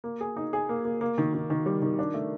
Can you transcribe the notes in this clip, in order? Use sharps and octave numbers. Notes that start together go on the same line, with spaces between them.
A#3
G#4
D#4
G#4
A#3
A#3
A#3
D#3
D#3
D#3
G3
D#3
D4
A3